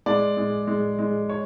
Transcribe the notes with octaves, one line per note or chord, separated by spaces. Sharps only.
G#3 D5
G#3
G#3
G#3
C#5